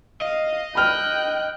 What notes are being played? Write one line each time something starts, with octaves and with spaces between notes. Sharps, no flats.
D#5 F5
G5 B5 F6 F#6